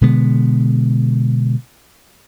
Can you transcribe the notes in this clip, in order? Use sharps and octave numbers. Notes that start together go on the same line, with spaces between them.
B2 D3 G#3 B3